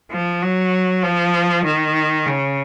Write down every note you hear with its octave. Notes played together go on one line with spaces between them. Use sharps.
F3
F#3
F3
D#3
C#3